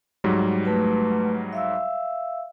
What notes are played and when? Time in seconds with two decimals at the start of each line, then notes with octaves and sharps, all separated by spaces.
0.24 G#2 F#3 G3
0.65 A3 B4
1.53 E5 F5 E6